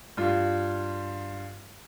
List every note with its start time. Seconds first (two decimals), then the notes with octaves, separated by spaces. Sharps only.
0.17 G2 F4